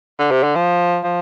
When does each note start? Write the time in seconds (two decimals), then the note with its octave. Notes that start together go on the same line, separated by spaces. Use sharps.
0.19 D3
0.31 C3
0.43 D3
0.55 F3
1.04 F3